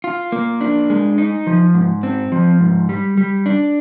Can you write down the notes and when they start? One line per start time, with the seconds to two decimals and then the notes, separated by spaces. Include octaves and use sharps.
0.04 F4
0.32 A#3
0.61 D4
0.90 G#3
1.18 D#4
1.47 F3
1.75 G#2
2.03 C4
2.32 F3
2.61 G#2
2.89 G3
3.17 G3
3.46 D4